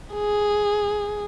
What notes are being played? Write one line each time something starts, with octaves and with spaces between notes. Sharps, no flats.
G#4